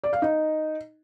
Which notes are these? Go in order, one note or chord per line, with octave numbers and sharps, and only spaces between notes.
D5
F5
D#4